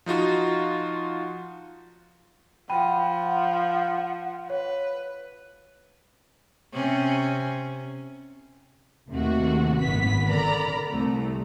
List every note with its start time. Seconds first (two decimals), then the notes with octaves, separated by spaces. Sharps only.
0.06 F3 D#4 F4 F#4
2.69 F3 F#5 G5 B5 D#7
4.50 B4 C#5
6.73 C3 C#4
9.11 D#2 C3 A3 F#4
9.80 G#1 F#2 A#2 B3 B6
10.29 D3 A#4 D5 A#5 B5
10.90 C2 A3